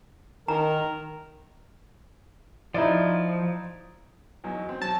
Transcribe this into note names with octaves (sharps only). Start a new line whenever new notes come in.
D#3 A#4 A#5
F3 D#4 E4 D5
E2 F#3 D#4
C4
F#3 A5